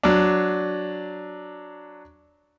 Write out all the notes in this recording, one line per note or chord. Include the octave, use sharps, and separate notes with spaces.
F#3 D4